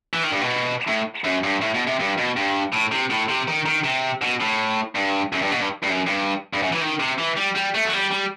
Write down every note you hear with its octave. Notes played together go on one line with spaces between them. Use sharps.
E3
D#3
G2
B2
A2
F#2
G2
A2
B2
C3
G2
B2
G2
A2
C3
A2
C3
D#3
D#3
C3
B2
A2
G2
F#2
G2
B2
G2
G2
F#2
G2
G2
F#2
E3
D#3
C3
E3
G3
G3
A3
F#3
G3
G3